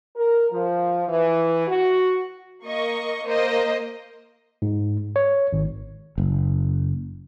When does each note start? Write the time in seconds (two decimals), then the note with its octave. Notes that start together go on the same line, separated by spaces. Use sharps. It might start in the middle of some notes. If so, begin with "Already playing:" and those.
0.16 A#4
0.52 F3
1.09 E3
1.68 F#4
2.66 A#3 D#5 C#6
3.26 A#3 C5 D#5
4.62 G#2
5.16 C#5
5.53 G#1
6.18 F#1